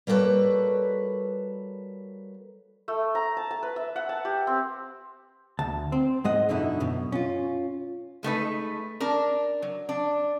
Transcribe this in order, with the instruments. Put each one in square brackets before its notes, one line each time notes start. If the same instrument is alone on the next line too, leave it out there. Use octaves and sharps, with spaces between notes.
[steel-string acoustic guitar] G3 A#3 F#4 A4 B4 C#5
[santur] A3
A#5
A5
A5
B4
E5
F#5
A5
G4
C4
[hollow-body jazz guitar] D2 A5
C4
G#2 G#3 D#5 F#5
F#2 B2 D3 D#4 E4
F#2 B2
C#4 F4
[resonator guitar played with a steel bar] G#3 A3 D#4 B4
D4 A#4
F#3
D4